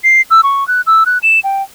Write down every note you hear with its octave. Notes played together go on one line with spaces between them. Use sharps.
C7
E6
C#6
F#6
E6
F#6
E7
G5